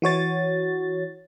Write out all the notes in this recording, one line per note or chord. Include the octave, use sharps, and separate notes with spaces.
E3 F#4 C#5 A6